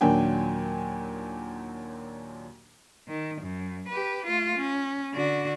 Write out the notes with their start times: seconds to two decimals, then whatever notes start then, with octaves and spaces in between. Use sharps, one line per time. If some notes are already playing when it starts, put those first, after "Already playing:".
0.01 D#2 A#2 F#3 D4 G5 G#5
3.08 D#3
3.41 F#2
3.89 G4 B4
4.26 A3 F4
4.56 C#4
5.14 D3 F#4